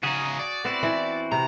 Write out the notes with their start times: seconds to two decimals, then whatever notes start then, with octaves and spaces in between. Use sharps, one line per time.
0.03 C#3 D#4 F#4 G#4
0.39 D5
0.65 B3 C4 E4 F#4
0.83 E3
1.32 C3 A#5